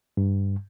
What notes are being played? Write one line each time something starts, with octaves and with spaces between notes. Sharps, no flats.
G2